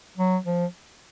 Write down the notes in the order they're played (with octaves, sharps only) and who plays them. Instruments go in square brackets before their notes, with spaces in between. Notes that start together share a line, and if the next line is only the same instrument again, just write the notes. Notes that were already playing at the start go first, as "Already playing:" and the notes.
[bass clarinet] F#3
F3